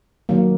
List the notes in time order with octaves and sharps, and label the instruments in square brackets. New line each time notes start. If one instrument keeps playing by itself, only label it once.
[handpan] D#3 F#3 A#3